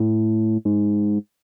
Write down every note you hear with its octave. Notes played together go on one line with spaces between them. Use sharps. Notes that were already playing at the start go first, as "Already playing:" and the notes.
Already playing: A2
G#2